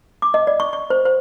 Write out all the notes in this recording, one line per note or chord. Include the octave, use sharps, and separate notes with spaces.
D6
D#5
D5
C#6
C#6
C5
C5